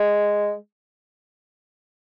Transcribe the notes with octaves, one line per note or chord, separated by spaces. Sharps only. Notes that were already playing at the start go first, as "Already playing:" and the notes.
Already playing: G#3